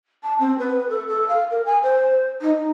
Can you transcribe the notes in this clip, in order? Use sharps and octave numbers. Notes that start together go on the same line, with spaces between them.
A5
C4
B4
A4
A4
F5
A#4
G#5
C5
D#4